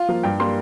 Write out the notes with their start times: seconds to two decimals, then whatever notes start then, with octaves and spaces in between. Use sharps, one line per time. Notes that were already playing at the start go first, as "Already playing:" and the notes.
Already playing: F4
0.09 F3 A#3
0.23 G2 G5
0.39 G3 A#3 C6